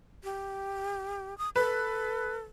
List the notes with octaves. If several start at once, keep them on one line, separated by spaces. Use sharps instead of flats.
G4
D#6
A4 B4